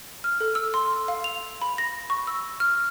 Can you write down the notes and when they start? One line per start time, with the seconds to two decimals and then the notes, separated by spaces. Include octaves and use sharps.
0.24 F6
0.41 A4
0.55 E6
0.74 C6
1.08 F5
1.24 F7
1.62 B5
1.78 A#6
2.10 C#6
2.27 E6
2.60 F6